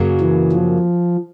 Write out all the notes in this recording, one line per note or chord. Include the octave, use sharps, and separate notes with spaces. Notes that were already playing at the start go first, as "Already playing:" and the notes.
Already playing: F#2 C#3 F#3 A#3
E3
F3